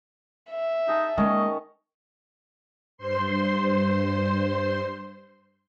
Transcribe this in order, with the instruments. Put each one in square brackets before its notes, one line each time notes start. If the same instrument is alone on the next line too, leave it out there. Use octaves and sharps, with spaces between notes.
[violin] E5
[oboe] D#4 [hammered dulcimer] G#4 A5
[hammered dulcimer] D#3 C#4 C#6 [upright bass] G#3 A#3 [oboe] D#5
[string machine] G2 C5 C6